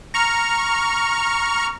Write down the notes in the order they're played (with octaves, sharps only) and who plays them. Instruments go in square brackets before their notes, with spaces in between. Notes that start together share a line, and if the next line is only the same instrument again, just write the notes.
[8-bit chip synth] A#5 C#6 F6